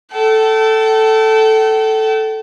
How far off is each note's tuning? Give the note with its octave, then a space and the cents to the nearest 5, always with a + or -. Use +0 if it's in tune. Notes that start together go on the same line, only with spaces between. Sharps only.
A4 +0 G5 -40